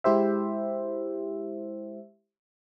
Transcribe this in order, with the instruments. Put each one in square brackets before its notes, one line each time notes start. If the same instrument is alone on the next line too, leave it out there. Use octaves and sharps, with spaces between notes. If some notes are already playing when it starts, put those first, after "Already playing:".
[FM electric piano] G#3 E4 G4 C5 E5